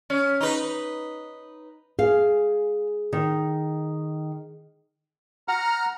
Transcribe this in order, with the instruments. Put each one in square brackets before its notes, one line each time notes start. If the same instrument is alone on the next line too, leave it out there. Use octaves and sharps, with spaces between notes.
[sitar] C#4
D#4 B4
[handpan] G#4 [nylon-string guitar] F5
[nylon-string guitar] D#3
[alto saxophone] F#5 [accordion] A#5 F6